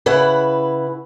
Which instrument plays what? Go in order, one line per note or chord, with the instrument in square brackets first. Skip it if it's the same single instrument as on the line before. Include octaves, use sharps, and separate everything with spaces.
[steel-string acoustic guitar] C#3 E4 B4 F#5